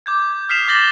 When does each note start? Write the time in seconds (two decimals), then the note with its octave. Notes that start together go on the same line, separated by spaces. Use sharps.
0.06 D6 G6 G#6
0.49 D#6 F6 B6 C7 E7 F7
0.68 D6 G6 A6 A#6 F#7 G7